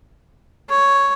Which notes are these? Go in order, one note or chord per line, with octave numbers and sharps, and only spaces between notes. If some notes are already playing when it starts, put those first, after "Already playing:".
C#5